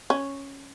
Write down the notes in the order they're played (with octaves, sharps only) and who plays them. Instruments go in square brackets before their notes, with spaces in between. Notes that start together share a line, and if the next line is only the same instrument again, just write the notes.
[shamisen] C#4